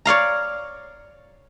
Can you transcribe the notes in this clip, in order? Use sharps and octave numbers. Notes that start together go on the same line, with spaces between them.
C#5 D5 F5 A#5